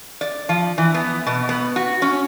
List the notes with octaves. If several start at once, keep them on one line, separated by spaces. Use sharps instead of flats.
D5
F3
E3
B3
B2
B3
F#4
C#4